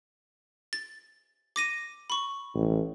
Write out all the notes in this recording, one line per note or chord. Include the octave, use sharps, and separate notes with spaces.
A6
D6 A#6 D#7
B5 C#6
A1